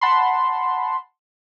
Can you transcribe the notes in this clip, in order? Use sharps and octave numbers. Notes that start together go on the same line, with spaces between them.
F#5 A5 B5 C6